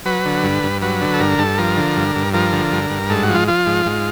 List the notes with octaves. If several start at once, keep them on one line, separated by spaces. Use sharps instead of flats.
F#3 B4
D3
G2
G2
F#3 B4
D3
A4
G2 A#4
G2 A4
F3 A#4
D3
G2
G2
F3 A#4
D3
G2
G2
G#2 A4
F#4
F3
F4
F3 F4
G#2
G#2